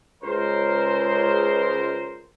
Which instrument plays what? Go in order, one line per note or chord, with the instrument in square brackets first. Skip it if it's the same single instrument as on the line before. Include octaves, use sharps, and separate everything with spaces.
[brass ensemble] C#2 A#4 C5